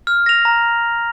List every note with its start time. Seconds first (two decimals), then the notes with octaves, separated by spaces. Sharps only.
0.07 F6
0.26 A#6 F7
0.45 A#5